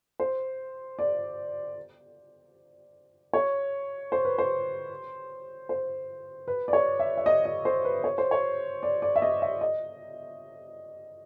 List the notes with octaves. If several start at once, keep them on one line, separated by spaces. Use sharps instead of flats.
C5
D5
C#5
C5
B4
C5
C5
B4
D5
C#5
E5
E5
D#5
D#5
C5
B4
C#5
C5
C#5
D5
D5
E5
D#5
E5
D#5